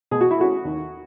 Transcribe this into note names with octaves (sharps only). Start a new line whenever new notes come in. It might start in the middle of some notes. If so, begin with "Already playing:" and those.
B2 G#4
F#4
E4
A3 C#4 F#4
D#2